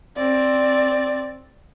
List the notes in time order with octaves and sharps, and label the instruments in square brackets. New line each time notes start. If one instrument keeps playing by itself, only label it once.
[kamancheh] C4 D5